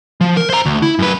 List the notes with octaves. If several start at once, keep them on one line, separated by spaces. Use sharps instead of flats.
F3
A#4
C5 A#5
D2
E4
F#2 B4